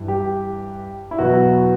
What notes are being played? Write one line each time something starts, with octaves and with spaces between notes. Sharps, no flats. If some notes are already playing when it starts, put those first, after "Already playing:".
Already playing: G2 E3
G4
E4
E2 B2 F#3 B3 F#4